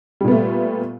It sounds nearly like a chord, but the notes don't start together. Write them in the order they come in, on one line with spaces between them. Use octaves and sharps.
G3 A#2 B3 A3